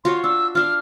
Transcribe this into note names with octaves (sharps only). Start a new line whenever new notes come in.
F4 F#4 C#5 C6
D4 E6
D4 F4 F6